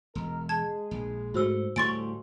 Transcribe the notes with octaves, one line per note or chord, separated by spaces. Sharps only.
E1 D#4 A#4
G#3 G#4 A5 G#6
A#1
G#2 A3 F#4 C5 E6
D2 A2 G3 G#5 C6 C#6 A6 D7